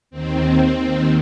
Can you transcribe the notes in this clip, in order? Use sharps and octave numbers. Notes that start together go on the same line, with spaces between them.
D#2 D#3 C4
D#2 D#3